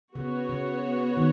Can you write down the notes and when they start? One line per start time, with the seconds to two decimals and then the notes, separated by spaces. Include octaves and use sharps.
0.15 C#3 B3 F#4 C#5
0.49 C#3
1.17 D#3